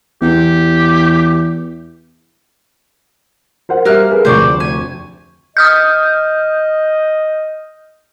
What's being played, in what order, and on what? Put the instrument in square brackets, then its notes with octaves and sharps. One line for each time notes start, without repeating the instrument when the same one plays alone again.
[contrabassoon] E2 [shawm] G4
[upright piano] A#4 C5 F#5
[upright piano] G3 E5 [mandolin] A#3 F6 F#6
[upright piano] G#4 B4
[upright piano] F1 D2 C#6 [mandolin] C5 D5
[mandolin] G#5
[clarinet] D#5 [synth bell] D#6 F6 G6